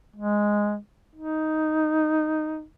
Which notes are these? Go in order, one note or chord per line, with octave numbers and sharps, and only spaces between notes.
G#3
D#4